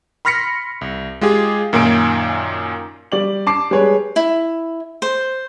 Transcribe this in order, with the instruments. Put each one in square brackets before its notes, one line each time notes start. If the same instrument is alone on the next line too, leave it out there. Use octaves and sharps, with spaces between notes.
[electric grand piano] B5 C6 F6 A#6 B6 C#7
C2
G#3 F4 G4 G#4
F#2 A#2 D#3 A#3 G#5 D7
[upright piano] G3 D5 F#7
A5 D6 C7
G3 G#3 G#4 B4 C#5
[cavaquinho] E4
C5